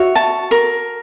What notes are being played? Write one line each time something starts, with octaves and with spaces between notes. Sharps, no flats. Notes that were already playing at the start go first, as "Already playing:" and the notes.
Already playing: F#4 C#5 E5
A5
A#4